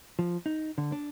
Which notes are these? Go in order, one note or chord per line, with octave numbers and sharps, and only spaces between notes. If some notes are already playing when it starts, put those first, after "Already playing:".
F3
D#4
D3
D4